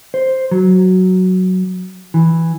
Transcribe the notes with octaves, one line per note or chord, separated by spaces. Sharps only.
C5
F#3
E3